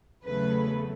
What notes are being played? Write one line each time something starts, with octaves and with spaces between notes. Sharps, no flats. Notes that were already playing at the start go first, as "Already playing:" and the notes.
E2 C#3 F#3 A3 B4